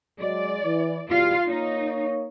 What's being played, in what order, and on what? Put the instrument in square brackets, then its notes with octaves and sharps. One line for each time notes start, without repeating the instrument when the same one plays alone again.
[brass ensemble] F#3 G#3 [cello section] D5
[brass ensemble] E3
[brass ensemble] E2 B2 G3 [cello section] F4 F5
[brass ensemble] A#3 C#5 [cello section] D#4